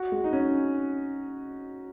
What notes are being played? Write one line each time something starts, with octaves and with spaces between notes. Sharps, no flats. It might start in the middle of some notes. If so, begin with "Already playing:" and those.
Already playing: F#4
G#3
D#4
C#4